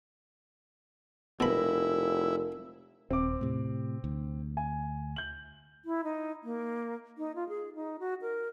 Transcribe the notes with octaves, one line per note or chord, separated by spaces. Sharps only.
F1 B2 E4 A#4 B5
D#1 C4 D6
A2 C3
D2
G#5
G6 F#7
E4
D#4
A#3
D#4
F4
G#4
D#4
F#4
A#4